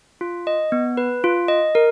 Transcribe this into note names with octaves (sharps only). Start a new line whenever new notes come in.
F4
D#5
B3
B4
F4
D#5
A#4